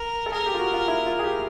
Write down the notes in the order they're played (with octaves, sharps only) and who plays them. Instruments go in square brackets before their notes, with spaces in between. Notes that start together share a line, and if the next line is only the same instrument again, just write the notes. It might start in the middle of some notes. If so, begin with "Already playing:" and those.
Already playing: [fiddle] A#4
[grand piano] A4
[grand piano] G#4 [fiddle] A#4
[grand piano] G4
F4
F#4
F4
E4
F4
G#4
G4